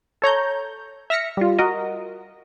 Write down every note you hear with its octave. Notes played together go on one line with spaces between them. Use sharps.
A4 C#5 A#5 G6
E5 F6 A#6 B6 C#7
G3 F4
F#4 A#4 D#5